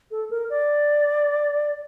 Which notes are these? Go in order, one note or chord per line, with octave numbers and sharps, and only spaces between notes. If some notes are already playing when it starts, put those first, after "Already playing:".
A4
A#4
D5